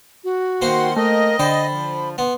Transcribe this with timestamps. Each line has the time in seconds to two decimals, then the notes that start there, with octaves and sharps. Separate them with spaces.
0.24 F#4
0.61 D#3 A#3 C4 C5 F#5 C6
0.96 A3 A#4 D#5
1.39 D3 A4 C5 G5 B5
1.71 F3
2.18 B3 C6